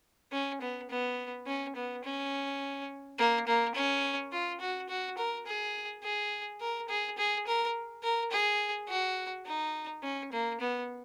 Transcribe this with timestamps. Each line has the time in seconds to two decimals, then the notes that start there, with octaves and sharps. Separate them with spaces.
0.32 C#4
0.61 B3
0.90 B3
1.47 C#4
1.76 B3
2.04 C#4
3.18 A#3
3.47 A#3
3.75 C#4
4.32 F4
4.60 F#4
4.89 F#4
5.18 A#4
5.46 G#4
6.03 G#4
6.60 A#4
6.89 G#4
7.18 G#4
7.47 A#4
8.03 A#4
8.31 G#4
8.88 F#4
9.46 D#4
10.03 C#4
10.32 A#3
10.60 B3